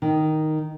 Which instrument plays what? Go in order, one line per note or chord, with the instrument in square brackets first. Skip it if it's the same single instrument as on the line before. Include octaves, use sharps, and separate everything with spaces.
[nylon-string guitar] D#3